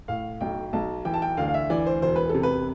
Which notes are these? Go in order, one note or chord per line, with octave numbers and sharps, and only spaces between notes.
A2 F5
B1 G5
B1 A5
E3 G5
A5
G5
D2 F5
F5
E5
E3 D5
C5
E1 C5
B4
A4
C3
B4